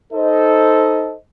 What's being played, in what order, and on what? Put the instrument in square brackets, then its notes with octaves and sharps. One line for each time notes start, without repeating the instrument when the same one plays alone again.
[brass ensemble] D#4 A4 C5 D#5